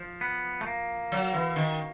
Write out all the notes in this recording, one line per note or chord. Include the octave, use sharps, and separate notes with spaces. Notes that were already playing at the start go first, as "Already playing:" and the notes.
Already playing: F3
B3
A3
A#3
F#3
E3
D#3